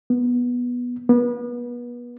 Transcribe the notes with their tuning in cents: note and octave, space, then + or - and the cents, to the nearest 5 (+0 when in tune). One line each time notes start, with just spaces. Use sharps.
B3 -10
B3 -30